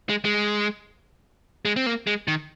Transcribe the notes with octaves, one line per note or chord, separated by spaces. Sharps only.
G#3
G#3
G#3
C4
A#3
G#3
D#3